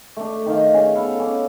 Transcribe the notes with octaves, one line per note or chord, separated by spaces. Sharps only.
A3 D4
D#3 C5 D#5 F5
C#4 G#4
B3 A4 F5
C#4 D6